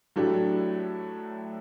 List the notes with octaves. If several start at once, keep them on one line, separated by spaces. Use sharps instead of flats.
A2 F#3 A3 D4 G4